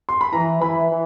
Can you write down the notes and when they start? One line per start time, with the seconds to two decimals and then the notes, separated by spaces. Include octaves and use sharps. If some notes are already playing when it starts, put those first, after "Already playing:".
0.09 C6
0.21 B5
0.33 E3 A#5
0.61 E3 B5
0.90 E3